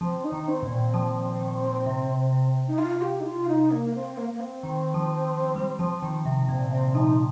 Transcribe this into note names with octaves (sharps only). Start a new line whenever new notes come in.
F3 C4
D#4
D#3
C4
A#2
C4
F3
D#3
C3
C3
D#4
F4
G4
D#4
F4
D#4
A#3
C4
A#3
A#3
C4
D#3
F3
F3
G3
F3
D#3
C3
C3
A#2 C4
C3 C4
F3 D#4